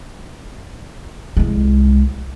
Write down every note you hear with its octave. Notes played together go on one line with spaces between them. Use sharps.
C2 G#3